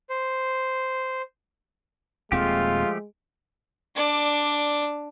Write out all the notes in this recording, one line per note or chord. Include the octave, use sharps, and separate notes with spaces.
C5
D#1 D#2 F3 G#3 A3 C4 F4 G4
D4 D5